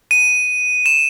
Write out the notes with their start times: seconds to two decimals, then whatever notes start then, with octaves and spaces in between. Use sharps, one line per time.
0.11 D#7
0.86 E7